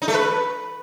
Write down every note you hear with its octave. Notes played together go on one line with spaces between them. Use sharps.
D#4
A3
B4